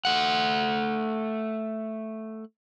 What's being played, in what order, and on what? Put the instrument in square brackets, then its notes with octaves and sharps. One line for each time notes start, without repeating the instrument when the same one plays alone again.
[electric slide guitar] A3 F#5